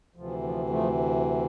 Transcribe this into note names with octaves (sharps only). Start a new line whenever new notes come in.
D2 C3 E3 F3
F3
F3 A3